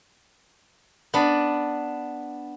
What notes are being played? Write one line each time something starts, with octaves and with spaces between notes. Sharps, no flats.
B3 D4 D5